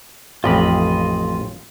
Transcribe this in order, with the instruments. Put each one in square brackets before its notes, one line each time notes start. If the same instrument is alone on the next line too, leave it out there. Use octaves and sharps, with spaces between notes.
[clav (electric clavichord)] A1 F2 G4 [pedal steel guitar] F4 D#5 B5